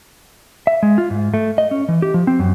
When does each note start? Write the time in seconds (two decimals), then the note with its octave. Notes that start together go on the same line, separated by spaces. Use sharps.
0.67 E5
0.83 G#3
0.98 F4
1.10 G#2
1.34 A3
1.58 D#5
1.71 C#4
1.89 E3
2.02 G4
2.14 F3
2.27 C4
2.39 F#2